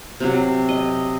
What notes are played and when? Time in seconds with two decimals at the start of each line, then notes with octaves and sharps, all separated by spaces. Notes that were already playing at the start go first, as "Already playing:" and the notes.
0.20 C3 F#3
0.69 D#5